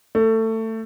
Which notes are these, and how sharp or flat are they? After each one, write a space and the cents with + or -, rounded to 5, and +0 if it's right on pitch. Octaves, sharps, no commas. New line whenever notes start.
A3 +20